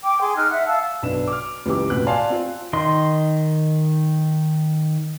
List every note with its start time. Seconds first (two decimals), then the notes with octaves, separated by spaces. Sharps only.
0.04 G5 D6
0.21 G#4 C6
0.36 D#4 F6 F#6
0.50 E5 F#5 F#6
0.67 F5 F#5 A5 E6
1.03 B1 D4 B4 E7
1.28 D6 F6
1.66 C#2 E3 G4 D6
1.90 A1 B2 B4 F#6
2.07 D5 F5 G#5 A5 C6
2.30 C4 F4
2.73 D#3 D#5 C6